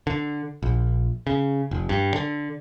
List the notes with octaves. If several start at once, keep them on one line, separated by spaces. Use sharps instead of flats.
D3
A#1
C#3
F1
G2
D3